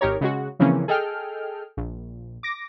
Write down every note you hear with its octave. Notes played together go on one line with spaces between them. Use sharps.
G#1 D#4 G4 A#4 C#5
C#3 G#3 F#4
C#3 E3 F3 A#3 C4 C#4
G#4 A4 D#5 G5 F6
A#1
D6 A#6